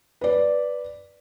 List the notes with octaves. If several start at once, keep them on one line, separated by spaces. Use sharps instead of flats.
B4 D5